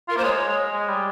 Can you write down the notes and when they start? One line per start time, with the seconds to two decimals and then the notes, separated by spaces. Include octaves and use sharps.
0.08 F4 A#4
0.16 A#3 C5
0.24 G#3 C#5
0.48 G#3
0.72 G#3
0.88 G3